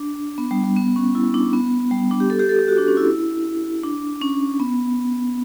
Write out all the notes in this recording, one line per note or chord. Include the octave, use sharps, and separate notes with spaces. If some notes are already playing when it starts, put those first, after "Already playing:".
Already playing: D4
B3
G3
G3
B3
C#4
E4
D4
B3
G3
D4
G4
A4
G4
A4
G4
F#4
D4
C#4
E4
D4
C#4
B3